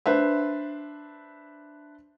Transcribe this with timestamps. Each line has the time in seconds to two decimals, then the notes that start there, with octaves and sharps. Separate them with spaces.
0.06 D4 B4 C5 E5